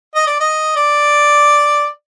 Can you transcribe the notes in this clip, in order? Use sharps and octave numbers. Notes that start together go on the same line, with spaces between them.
D#5
D5
D#5
D5